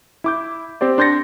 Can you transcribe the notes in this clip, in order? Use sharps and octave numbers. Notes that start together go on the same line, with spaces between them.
E4 D6 G6
C4 G4 C5 D5
D4 C6 G6 A6 A#6 C#7